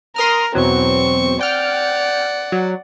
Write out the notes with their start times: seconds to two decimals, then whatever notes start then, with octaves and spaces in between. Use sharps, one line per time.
0.16 A#4 C6 D#6 F6
0.55 E2 B2 F#3 C4 C#6
1.41 D5 F#5 G5 F6
2.52 F#3